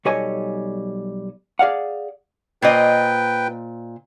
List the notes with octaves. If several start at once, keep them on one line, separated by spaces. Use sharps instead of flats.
B1 G3 A4 C#5 D#5 G#5
G#4 D5 F5 F#5
A#2 B4 C5 D#5 G5